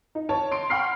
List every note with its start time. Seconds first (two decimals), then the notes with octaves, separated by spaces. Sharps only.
0.15 D#4
0.29 C#5 A5
0.52 C6 D7
0.70 F#5 G5 B5 C#6 F6 C7